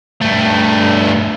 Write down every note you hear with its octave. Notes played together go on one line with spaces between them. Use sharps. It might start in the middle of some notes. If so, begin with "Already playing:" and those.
G2 A3